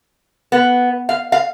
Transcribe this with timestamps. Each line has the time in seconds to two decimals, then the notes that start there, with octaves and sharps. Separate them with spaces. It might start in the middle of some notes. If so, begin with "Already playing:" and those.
0.52 B3
1.09 F5
1.32 F5